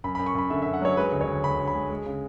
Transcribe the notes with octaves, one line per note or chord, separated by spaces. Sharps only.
F#2 B5
B5
F#2
C#6
F#2 B5
D3 E5
E5
F#2
F#5
F#3 C#5
G#3 B4
D2
C#5
D2
D2 B5
D2
B5
G#3
G#3
C#3